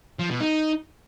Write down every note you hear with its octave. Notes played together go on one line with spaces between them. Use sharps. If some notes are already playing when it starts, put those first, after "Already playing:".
F3
B2
D#4